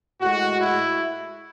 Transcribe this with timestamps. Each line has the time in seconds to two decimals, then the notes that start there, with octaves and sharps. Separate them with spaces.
0.21 A2 G#3 F#4
0.61 E4